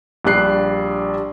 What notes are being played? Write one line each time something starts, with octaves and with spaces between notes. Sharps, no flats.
A#1 G3 D4 F#6 C7